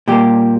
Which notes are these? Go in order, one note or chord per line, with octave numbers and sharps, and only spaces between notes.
A#2 G3 A#3 G4